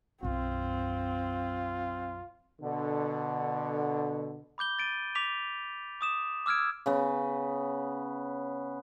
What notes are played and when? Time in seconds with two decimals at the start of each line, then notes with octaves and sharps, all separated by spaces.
0.23 B1 F#2 C4 F4
2.61 B2 D3
4.58 B5 D6 G6 G7
4.79 A6 D7 D#7
5.15 D6 B6 F7
6.01 D6 D#6 E7
6.46 D6 E6 F6 G#6 D7
6.86 C#3 B3